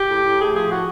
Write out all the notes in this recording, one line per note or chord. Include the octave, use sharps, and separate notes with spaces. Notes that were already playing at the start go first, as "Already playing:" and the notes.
Already playing: G4
A2
A2
A3 G#4
F3 G#4
A2 F#4